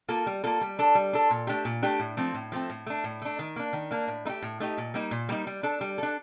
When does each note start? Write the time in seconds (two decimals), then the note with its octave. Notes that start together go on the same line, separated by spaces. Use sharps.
0.08 A#3 F4 A4
0.27 G3
0.44 A#3 F4 A4
0.61 G3
0.79 D4 A4
0.95 G3
1.13 D4 A4
1.31 A#2
1.47 A3 D4 G4
1.65 A#2
1.82 A3 D4 G4
2.00 A2
2.17 F3 A3 C4
2.34 A2
2.52 F3 A3 C4
2.70 A2
2.86 A3 D4
3.04 A2
3.22 A3 D4
3.39 D#3
3.56 A#3 D4
3.73 D#3
3.91 A#3 D4
4.08 A2
4.25 A3 D#4
4.29 G4
4.42 A2
4.60 A3 D#4 G4
4.78 A#2
4.94 G3 A#3 D#4
5.11 A#2
5.29 G3 A#3 D#4
5.47 G3
5.63 D4 A4
5.81 G3
5.98 D4 A4